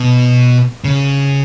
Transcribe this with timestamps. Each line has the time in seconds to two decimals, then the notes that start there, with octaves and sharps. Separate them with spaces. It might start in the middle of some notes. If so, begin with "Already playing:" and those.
Already playing: B2
0.84 C#3